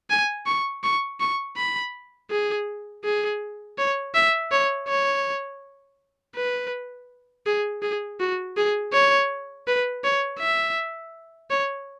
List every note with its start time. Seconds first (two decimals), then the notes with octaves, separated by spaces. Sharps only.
0.10 G#5
0.46 C#6
0.84 C#6
1.20 C#6
1.57 B5
2.31 G#4
3.05 G#4
3.78 C#5
4.14 E5
4.51 C#5
4.88 C#5
6.36 B4
7.46 G#4
7.82 G#4
8.20 F#4
8.57 G#4
8.93 C#5
9.67 B4
10.04 C#5
10.40 E5
11.51 C#5